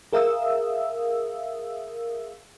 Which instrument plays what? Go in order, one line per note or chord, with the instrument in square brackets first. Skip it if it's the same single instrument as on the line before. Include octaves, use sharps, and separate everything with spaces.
[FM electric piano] G#4 A#4 E5 F5 D#6 E6